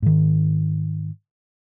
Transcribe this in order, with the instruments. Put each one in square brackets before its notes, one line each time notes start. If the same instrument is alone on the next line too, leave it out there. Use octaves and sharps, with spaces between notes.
[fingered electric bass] G#2 D#3